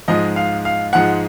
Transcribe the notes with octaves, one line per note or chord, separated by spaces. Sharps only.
G#2 F3 G#3 D#5
F5
F5
G#2 F3 G#3 F#5